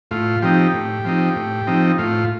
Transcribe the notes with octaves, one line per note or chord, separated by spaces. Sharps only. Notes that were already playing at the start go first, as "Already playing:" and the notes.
A2 F4
F3 C4 D#4 G4
A2
F3 C4 D#4
A2
F3 C4 D#4
A2 F4